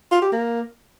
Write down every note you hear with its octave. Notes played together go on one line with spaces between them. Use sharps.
F4
G4
A#3